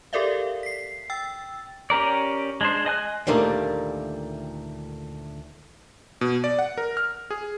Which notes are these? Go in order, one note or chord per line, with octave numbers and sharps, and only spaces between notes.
G4 A4 A#4 D5 E5 F5
B6 C7
G5 E6 A6
C#4 G4 A#4 D5
G#3 D4 C5
D#5 G#5 F#6
D2 A#2 D#3 G3 A3 A#3
B2
D5
F#5
A#4
F6
G#4